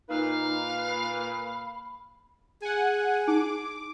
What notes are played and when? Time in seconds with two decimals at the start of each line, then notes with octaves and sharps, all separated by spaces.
0.09 A#2 D#4 B4 F5
0.89 B5
2.62 G#4 F#5 G#5
3.27 D#4 D6